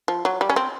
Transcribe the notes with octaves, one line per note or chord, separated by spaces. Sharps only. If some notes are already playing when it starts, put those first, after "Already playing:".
F3
F#3
G3
C#4
C4